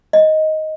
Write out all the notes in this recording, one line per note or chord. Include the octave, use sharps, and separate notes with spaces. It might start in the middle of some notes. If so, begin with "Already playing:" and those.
D#5